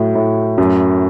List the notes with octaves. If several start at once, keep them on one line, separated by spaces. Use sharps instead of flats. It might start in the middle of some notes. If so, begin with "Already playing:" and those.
Already playing: A2 F#3
A2
F#2